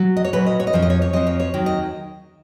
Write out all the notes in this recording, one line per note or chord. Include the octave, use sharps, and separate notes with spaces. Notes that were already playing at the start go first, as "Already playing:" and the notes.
Already playing: F#3
D#5
C#5
A#2 F#3 B4
D#5
C#5
D#5
F2 F3 C#5
D#5
C#5
C#5
F2 F3 D#5
C#5
C#5
D#2 D#3 F#3
D#5